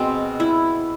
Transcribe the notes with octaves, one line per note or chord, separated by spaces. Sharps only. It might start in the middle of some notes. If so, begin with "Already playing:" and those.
Already playing: B2 G#3 C4
E4